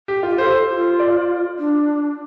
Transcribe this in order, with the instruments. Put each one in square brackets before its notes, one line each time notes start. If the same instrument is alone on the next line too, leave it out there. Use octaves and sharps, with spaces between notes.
[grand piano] G4
F4
[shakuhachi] G4
[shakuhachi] A4 [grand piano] C5
[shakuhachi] F4
[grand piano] D5
[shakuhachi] D4